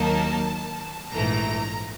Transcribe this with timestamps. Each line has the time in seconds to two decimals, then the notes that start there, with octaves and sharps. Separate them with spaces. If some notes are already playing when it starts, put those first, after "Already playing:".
Already playing: D#2 D#3 F#3 A#3 D#4 A5
1.12 A#1 G#2 E3 A3 A#5